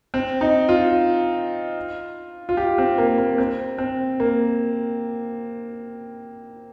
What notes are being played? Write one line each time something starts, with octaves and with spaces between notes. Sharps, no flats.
C4
D#4
F4
F4
G4
C4
A#3
A#3
C4
C4
A#3